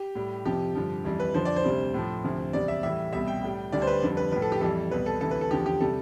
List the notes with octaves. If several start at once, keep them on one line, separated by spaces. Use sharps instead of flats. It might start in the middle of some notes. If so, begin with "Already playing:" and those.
Already playing: G4
A2 G3
F2 C3 F3 G4
G2 D3 F3
F2 E3 G3
B4
F2 D3 F3 C5
D5
C5
D2 C3 G3
A2 F3
D2 C3 F3
E2 C3 G3 D5
E5
A2 E3 G3 E5
C2 B2 G3 E5
G5
A2 G3
D2 D3 G3 D5
C5
B4
F2 D3 G3
B4
A2 F3 B4
A4
G4
F2 E3 G3 A4
C2 B2 G3 B4
A4
D2 C3 E3 A4
B4
A4
E2 D3 F3 G4
G4
C3 G3 A4